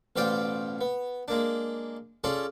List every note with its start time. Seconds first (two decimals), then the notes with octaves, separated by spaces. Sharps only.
0.16 A1 B2 F4 C5 D5 G5
0.81 B3
1.28 G#3 A#3 D4
2.24 C#4 F4 G#4 A4 D5